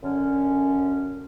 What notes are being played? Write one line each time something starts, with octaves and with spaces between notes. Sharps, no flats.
F#2 D3 C#4